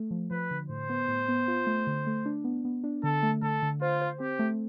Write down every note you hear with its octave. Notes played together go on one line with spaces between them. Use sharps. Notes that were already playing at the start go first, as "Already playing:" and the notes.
Already playing: A3
F3
F3 B4
D3
A2 C5
B3
A2
B3
F4
A3
D3
A3
D4
B3
B3
D4
D3 A4
A3
D3 A4
D3
F4 C5
C5
C4 G4
A3